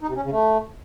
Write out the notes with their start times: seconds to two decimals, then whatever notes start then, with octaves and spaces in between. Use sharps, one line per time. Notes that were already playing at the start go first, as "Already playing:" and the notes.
0.01 D#4
0.09 C3
0.16 C#4
0.24 C#3
0.32 A3